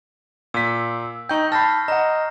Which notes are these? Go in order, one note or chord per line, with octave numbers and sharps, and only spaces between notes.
A#2 E6 B6
D#4 G5 C#6 G6
A5 B5 F6 A#6 C7
D#5 F#5 A#5